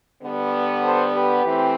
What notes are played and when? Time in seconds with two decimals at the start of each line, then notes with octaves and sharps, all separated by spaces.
0.22 D3 G3 B3
0.83 A4 C5
1.13 G4 B4
1.43 E3 A3 C4